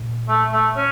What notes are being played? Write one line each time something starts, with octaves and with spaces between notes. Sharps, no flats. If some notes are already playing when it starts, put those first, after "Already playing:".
Already playing: A#2
A3
A3
C#4